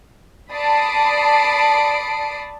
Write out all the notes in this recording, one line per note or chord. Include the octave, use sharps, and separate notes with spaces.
D5 A5 B5 D#6 C7 D7